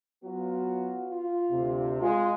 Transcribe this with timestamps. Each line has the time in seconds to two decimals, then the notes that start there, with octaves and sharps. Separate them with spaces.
0.24 F#3 B3 F4 F#4
1.10 F4
1.50 D2 C3
2.01 G#3 F4